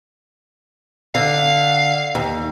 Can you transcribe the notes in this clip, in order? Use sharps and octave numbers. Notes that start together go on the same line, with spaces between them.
D3 F5
D#2